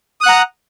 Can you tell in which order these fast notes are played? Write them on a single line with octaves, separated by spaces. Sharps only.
D#6 F#6 F#5 A#5